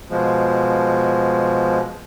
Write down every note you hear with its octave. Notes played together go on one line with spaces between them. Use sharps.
B2 F3 G#3